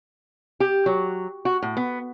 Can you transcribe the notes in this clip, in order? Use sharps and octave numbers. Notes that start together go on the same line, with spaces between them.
G4
F#3
F#4
A2
B3